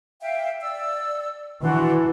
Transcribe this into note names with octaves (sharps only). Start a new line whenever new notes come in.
E5 F5 G5
D5 E6
E3 D4 F#4 C6